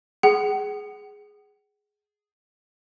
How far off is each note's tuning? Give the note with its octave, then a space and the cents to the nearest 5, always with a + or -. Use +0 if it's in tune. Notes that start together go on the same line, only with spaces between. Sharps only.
G#4 +0 F#5 +45